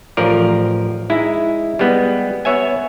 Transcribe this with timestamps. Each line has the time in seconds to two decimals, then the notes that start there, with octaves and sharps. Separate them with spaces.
0.17 A1 F3 A#4 D5
1.10 G#3 D#4 E4
1.79 G3 G#3 B3
2.45 B3 C#5 E5 G#5